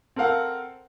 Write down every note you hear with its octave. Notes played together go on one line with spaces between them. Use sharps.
C4 A4 A#4 F5 F#5